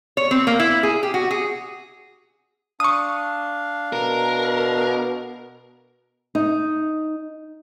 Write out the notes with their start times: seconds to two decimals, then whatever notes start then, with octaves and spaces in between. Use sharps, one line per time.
0.17 C#5
0.31 C4
0.47 A#3
0.60 E4
0.83 G#4
1.03 G4
1.14 F#4
1.31 G#4
2.80 D4 F5 C#6 D#6
3.93 B2 A#4
6.35 D#4